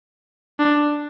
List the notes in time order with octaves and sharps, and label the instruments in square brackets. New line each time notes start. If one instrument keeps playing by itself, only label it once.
[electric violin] D4